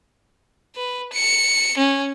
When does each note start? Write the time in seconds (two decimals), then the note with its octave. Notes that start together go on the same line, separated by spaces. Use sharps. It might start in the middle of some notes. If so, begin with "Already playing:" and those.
0.76 B4
1.13 C#7
1.78 C#4